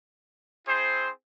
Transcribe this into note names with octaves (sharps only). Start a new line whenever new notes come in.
C4 E4 G#4 C5